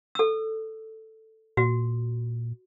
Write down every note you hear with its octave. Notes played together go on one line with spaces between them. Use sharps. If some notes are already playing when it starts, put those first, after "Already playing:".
A4 E6
A#2 F#4